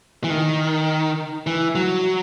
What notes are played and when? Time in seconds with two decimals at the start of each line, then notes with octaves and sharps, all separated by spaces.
0.24 E3
0.30 D#3
1.47 E3
1.75 F#3